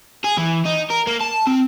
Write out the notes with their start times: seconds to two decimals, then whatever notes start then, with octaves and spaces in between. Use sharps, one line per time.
0.24 G#4
0.37 E3
0.65 D#4
0.90 A#4
1.07 A#3
1.21 A5
1.47 C4